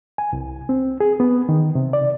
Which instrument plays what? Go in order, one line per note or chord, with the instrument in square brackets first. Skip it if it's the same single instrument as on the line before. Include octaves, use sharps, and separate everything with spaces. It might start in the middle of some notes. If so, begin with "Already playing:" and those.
[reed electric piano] G#5
C2
C4
G#4
B3
D#3
C3
D5